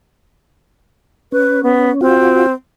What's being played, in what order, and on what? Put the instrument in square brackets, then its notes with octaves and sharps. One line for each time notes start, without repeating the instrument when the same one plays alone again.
[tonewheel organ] C#4 [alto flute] B4
[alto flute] B3
[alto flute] C4 [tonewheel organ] F4 F#4